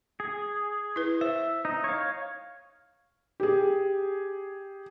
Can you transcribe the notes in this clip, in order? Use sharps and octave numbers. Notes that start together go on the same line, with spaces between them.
G#4
E4 B4
C5 E5
D#4
C#5 F5
G4 G#4